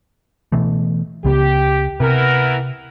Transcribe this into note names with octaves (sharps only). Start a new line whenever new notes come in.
B2 E3 A3
C#2 C#3 B3 G4
C3 E3 B3 A#4